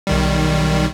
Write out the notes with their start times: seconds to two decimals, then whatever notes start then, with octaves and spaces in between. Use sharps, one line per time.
0.07 B1 D#3 G3